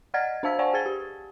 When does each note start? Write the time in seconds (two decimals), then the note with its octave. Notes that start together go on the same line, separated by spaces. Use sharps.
0.14 D5 D#5 F#5 F6 G#6 A6
0.43 D4 C5 F5 A5 E6 B6
0.59 C5 D5 F#5 G#5 A5 C#6
0.74 G#4 G5 G#6 A6 G7
0.86 G4